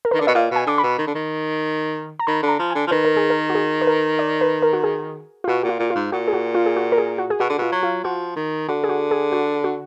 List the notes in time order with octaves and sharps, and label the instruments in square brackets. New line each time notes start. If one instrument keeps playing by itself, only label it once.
[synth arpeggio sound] A#4
B4
[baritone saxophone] D#3
[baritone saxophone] D3 [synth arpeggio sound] D5
[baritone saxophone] B2 [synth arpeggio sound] D#5
[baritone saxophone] A#2 [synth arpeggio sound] F5
[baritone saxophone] B2 [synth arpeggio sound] G#5
[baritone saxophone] D3 [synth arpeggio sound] D6
[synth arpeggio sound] B5
[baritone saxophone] B2
D#3
D3
D#3
[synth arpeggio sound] A#5
[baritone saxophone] D#3 [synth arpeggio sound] B5
[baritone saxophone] D3
[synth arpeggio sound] A#5
[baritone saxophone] F3
[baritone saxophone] D3 [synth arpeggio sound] G#5
[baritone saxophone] F3
[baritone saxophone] D#3 [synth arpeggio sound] B4
[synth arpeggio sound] A#4
G#4
A#4
F#4
G#4
B4
A#4
D5
B4
A#4
F#4
G#4
F4
[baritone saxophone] B2 [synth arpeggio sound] F#4
[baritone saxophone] A#2 [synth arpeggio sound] F#4
[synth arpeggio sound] F4
[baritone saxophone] A#2
[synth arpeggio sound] F4
[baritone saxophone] G#2
[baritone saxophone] A#2 [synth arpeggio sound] F#4
[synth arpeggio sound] G#4
F#4
F4
G#4
F#4
A#4
G#4
F#4
G#4
[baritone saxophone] B2 [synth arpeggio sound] F#4
[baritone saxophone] D3
[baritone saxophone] B2 [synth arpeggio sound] F4
[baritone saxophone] F#3
[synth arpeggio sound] F4
[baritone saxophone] F3 [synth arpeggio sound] F#4
[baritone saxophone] D#3
[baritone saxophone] D3 [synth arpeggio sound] F#4
[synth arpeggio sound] G#4
F#4
G#4
F#4
F#4